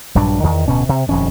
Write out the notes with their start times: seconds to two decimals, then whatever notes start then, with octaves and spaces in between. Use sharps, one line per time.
0.15 A#1 G2 F#3 D4
0.43 E2 D#3
0.68 D1 B2 C#4
0.89 C3
1.09 D#1 F2 C#4